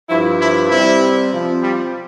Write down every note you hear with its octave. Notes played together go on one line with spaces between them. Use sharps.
G2 F3 E4
E4
C3 G3 E4
C3 F3
G3